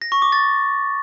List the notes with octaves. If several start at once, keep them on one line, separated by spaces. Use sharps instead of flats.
A#6
C#6
D6
A6